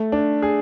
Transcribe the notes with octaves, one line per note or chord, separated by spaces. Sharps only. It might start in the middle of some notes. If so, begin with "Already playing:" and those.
Already playing: A3
D4
G#4